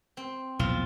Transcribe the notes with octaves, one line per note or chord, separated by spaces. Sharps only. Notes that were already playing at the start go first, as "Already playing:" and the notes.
C4
B1 E2 A#2 F3 F4